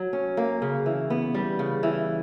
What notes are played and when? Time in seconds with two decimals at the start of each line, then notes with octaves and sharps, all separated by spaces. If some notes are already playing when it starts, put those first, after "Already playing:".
Already playing: F#3
0.13 C#4
0.37 A#3
0.62 C#3
0.86 E3
1.10 B3
1.34 G3
1.59 C#3
1.83 E3